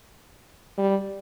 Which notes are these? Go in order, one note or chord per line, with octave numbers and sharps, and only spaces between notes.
G3